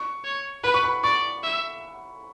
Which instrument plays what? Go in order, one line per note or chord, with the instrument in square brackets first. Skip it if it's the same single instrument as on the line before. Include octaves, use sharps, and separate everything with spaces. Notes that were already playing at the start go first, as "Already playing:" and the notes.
Already playing: [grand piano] C#6
[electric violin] C#5
[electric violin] B4 [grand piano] B5
[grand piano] C#6
B5
[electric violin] D5 [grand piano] C#6
[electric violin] E5